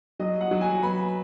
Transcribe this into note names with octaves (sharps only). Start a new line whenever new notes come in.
F#3 D#5
F#5
F#3
G#5
B3 B5